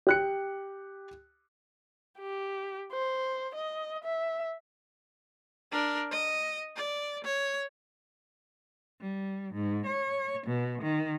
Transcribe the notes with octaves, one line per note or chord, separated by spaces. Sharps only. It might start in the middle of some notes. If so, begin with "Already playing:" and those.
G4 F#6 C#7
G4
C5
D#5
E5
D4 A#4
D#5
D5
C#5
G3
G#2
C#5
B2
D#3